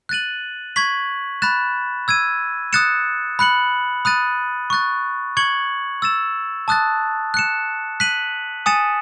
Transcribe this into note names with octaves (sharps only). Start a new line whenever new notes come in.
F#6 A6 D#7 F#7
C#6 G#6 B6 F#7
B5 F#6 A6 E7
E6 G#6 D#7
D#6 F#6 A6 C#7 E7
B5 F#6 C#7 F#7
B5 D#6 F#6 A6 D#7
C#6 F#6 A6
C#6 G#6 C#7 F#7
E6 A6 E7
A5 D#6 F#6 A6
F#6 C#7 E7
F#6 B6 D#7 F#7
G#5 D#6 A6 C#7 E7